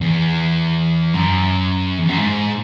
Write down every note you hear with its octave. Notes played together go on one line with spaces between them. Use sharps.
E2
F#2
E2
F#2
G#2